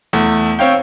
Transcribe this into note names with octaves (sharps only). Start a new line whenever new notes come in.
E2 A3
C4 C#5 F5 G5